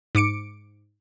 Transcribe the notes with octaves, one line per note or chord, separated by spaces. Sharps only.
G#2 D6 C#7 D7